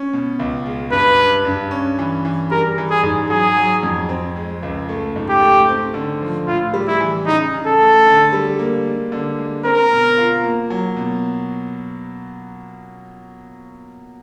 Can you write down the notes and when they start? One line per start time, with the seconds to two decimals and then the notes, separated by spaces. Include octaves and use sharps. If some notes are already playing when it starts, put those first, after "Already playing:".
Already playing: C#4
0.13 B2
0.39 C#2
0.66 G#3
0.92 G2 B4
1.19 G2
1.45 G2
1.71 C#4
1.99 E3
2.25 E3
2.51 G3 A#4
2.78 E3
2.90 G#4
3.03 G#2
3.30 F#3 G#4
3.57 F#3
3.83 F2
4.09 C4
4.36 G#3
4.63 C#2
4.89 A3
5.16 G#2
5.29 G4
5.41 A3
5.68 C4
5.94 D3
6.22 F3
6.47 A2 F4
6.74 G3
6.87 E4
7.00 E3
7.26 C#3 D#4
7.53 C#3
7.66 A4
7.80 A3
8.07 D3
8.33 G3
8.59 A#3
8.86 G#3
9.12 D3
9.39 G#3
9.65 C4 A#4
9.91 B2
10.17 F4
10.43 A#3
10.70 F#3
10.97 B2